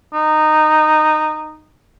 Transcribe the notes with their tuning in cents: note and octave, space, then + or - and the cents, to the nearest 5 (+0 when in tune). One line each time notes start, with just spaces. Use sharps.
D#4 -15